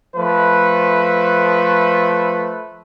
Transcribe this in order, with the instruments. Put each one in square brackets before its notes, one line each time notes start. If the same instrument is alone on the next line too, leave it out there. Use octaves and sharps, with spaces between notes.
[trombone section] F3 A3 B4